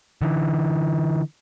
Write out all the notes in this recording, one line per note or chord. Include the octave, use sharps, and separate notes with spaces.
D3 E3